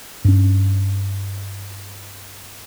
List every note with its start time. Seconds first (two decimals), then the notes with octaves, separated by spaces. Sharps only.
0.25 G2 C#4